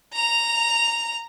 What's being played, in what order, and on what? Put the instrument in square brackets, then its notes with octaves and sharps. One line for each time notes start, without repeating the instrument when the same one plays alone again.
[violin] A#5 F7